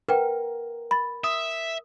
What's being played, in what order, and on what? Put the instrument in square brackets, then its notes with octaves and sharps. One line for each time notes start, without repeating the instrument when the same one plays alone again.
[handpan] A#4 [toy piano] B4 F#5 G5
[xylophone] B5 A6
[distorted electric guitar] E5 [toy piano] D#6